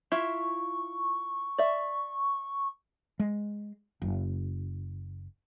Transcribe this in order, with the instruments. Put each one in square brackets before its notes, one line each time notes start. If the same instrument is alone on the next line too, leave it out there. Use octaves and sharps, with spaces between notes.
[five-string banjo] E4 F4 E5 [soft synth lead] C#6
[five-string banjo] D5 E5
[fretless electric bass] G#3
F#1